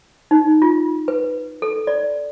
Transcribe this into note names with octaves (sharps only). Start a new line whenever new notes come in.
D#4
F4
B4
A4
D5